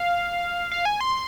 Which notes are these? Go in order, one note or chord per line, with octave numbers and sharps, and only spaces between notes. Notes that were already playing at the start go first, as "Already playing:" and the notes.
Already playing: F5
F5
G#5
C6